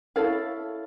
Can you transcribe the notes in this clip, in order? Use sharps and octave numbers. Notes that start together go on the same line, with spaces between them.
E4 A4 C#5 F5